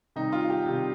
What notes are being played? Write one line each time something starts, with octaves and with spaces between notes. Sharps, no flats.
C3 D#3 G3 D#4
F4
G4
C3 D#3 G3